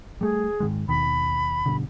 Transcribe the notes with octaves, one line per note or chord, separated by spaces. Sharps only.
G3 A3 G#4
G#2 D#3 G#3
D#2 B2 D#3 B5
G2 B2 D3